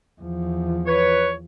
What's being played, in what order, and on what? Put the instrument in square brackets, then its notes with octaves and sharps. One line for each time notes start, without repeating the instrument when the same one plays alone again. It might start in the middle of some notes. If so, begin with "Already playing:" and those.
[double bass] E2 F3
[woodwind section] B4 C#5